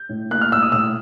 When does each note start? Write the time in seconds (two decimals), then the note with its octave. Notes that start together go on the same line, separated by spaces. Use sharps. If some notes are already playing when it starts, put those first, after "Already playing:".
Already playing: G6
0.09 A2
0.31 A#3 F#6
0.41 F6
0.52 A2 E6
0.62 D#6
0.72 A2 E6